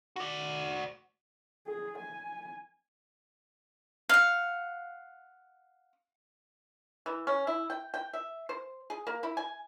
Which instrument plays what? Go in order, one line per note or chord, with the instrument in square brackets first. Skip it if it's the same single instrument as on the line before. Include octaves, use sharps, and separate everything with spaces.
[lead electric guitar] F#4 D5
[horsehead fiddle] G#4
G#5
[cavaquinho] F5 F#5
[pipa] E3
C#4
E4
G5
G5
E5
C5
G#4
A#3
E4
G#5